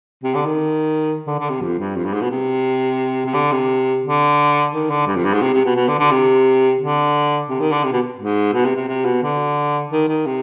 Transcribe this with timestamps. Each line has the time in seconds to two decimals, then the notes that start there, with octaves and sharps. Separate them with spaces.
0.24 C3
0.35 D3
0.46 D#3
1.27 D3
1.39 D3
1.49 C3
1.61 F2
1.79 G2
1.96 F2
2.05 G2
2.14 G#2
2.22 B2
2.30 C3
3.26 C3
3.34 D3
3.52 C3
4.04 D3
4.72 D#3
4.90 D3
5.07 G2
5.16 F2
5.25 G2
5.34 G#2
5.42 C3
5.53 C3
5.65 B2
5.76 B2
5.88 D3
5.99 D3
6.11 C3
6.81 D3
7.49 C3
7.60 D#3
7.72 D3
7.84 C3
7.92 B2
8.18 G#2
8.53 B2
8.65 C3
8.76 C3
8.88 C3
9.05 B2
9.23 D3
9.91 D#3
10.08 D#3
10.26 C3